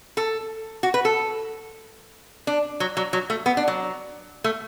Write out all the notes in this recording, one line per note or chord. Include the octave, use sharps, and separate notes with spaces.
A4
F#4
B4
A4
D4
F#3
F#3
F#3
A3
B3
D4
F#3
A3